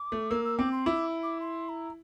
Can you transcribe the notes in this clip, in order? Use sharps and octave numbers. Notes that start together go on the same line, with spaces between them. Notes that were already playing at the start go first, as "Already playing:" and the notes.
Already playing: D6
A3
A#3 E6
E6
C4 D6
C6
E4 D6
D6
C6
A#5